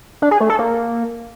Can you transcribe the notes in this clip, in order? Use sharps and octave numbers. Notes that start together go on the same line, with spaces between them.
D4
G#4
A3
A4
A#3